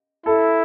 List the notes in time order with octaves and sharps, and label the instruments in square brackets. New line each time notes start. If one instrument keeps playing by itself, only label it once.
[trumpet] E4 [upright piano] A4